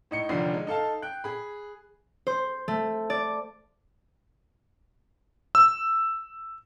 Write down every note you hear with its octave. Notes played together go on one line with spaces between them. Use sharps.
A2 D#4 C#7
F1 D#2 D3 D#3 F3 C7
G#3
D#4 A4 F5 A5
G5 F#6
G#4 B5
C5
A3
D5
E6